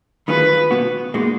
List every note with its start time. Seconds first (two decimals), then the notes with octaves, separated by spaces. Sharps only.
0.28 D#3 F#3 B3 F4 G#4 B4
0.71 B2 F#3 B3 F#4
1.14 A#2 G#3 D#4 F#4